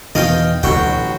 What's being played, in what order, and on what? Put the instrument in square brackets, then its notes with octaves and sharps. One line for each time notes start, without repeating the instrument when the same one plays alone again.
[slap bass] E2 B2 D#3 [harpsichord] D#5 F5 G5
[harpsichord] A1 F#4 G5 [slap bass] D2 B2 F#3